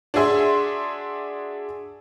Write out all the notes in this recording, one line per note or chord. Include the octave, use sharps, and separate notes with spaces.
D4 F#4 G#4 E5 C6